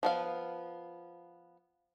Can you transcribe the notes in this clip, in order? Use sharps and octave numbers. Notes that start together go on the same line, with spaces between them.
F3 B3 F5